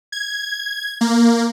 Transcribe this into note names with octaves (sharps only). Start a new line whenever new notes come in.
G#6
A#3